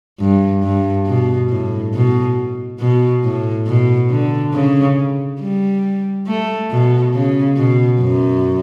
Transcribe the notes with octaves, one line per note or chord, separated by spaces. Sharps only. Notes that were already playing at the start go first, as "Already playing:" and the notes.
G2
G2
B2
A2
B2
B2
A2
B2
D3
C#3
G3
A3
B2
C#3
B2
F#2